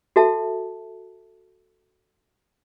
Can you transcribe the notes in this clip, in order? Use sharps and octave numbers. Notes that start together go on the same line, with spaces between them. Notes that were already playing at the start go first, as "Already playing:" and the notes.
F#4 A4 E5 A5